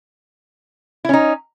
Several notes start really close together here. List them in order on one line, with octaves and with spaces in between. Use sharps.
E4 C#4 D#4